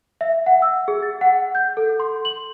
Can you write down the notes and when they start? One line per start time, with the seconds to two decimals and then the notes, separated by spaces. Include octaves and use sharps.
0.21 E5
0.46 F#5
0.62 E6
0.88 G#4
1.02 A6
1.21 F#5
1.55 G6
1.77 A4
2.00 C6
2.25 F#7